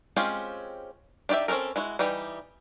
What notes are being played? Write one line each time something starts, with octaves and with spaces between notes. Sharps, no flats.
G#3 C4 C#4 F4 G4
D4 D#4 G4 D5 E5
C4 C#4 D#4 A4 A#4
G#3 E4 F#4
E3 G3 D#4 G4